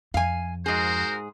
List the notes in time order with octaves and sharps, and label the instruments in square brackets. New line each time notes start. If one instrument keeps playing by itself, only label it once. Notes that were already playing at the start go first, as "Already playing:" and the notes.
[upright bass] F2 [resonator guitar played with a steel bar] F5 G#5
[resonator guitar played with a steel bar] G#2 G#4 [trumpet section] F#4 A#4 C5